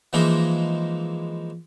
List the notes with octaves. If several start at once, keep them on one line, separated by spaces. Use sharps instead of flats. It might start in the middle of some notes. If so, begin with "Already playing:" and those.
E3 F3 G#3 A#3 D#4 E4